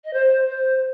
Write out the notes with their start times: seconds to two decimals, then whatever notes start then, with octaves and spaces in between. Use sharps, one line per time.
0.04 D#5
0.13 C5
0.49 C5